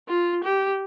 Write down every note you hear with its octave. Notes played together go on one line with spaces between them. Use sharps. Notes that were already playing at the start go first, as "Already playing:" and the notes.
F4
G4